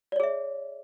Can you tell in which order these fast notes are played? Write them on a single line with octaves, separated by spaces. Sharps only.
D5 C#5 G#4 E5